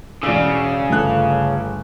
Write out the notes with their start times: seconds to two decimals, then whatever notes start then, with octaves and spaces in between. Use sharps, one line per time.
0.23 E1 C#3 D5 E6
0.90 G1 A3 F#6